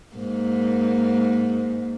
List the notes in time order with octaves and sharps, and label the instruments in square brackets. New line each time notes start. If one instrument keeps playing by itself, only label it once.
[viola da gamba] G#2 A#3